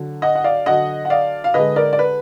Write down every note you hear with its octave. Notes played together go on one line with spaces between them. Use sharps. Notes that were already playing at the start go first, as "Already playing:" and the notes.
Already playing: D3 F#3
D#5 F#5
F#5
D5 F5
D3 F#3 D#5 F#5
F#5
D5 F5
F5
D3 G#3 B4 D#5
A#4 D5
D5
B4